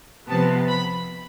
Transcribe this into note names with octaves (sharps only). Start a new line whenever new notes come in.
C3 F3 B3 A5
B5